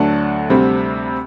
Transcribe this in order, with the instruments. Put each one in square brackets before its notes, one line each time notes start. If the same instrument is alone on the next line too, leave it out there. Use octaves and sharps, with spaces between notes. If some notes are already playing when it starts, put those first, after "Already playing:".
Already playing: [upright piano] D2 D3 F#3 A3 D4 F#5 A5
D2 C3 G3 C4